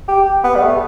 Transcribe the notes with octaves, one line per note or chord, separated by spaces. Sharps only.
G4
B3
G3
A3